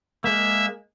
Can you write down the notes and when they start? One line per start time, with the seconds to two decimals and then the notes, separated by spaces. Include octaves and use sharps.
0.24 G#3 A#3 E5